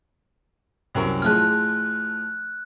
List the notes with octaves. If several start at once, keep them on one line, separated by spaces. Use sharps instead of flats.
C2 F#2 A#4
A2 F3 G#3 F6 F#6